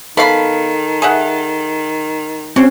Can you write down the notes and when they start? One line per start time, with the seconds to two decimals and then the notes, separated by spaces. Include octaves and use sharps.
0.17 D#3 B3 A4 F5 B5
1.02 G#4 E5 F#5
2.56 C4 C#4 F#4 C5